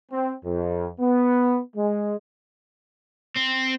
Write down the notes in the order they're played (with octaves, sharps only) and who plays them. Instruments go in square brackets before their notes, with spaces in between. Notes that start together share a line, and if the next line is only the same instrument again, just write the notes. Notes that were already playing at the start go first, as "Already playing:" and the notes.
[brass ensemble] C4
F2
B3
G#3
[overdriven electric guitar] C4